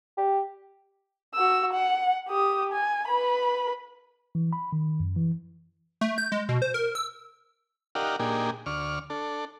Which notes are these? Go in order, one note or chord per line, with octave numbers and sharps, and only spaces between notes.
G4
F#4 E6
F#5
G4 D#6
G#5
B4 B5
E3
B5
D#3
F#2
E3
A3
G6
G#3
B2
C5
A#4
E6
D#4 G4 A#4 D5 F5 F#5
A#2 A#3 D4 D#4 G4 G#4
D2 D5 C#6 F6
D4 A4